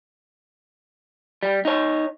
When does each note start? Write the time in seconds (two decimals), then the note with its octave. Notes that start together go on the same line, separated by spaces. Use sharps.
1.43 G3
1.65 D#4 C#5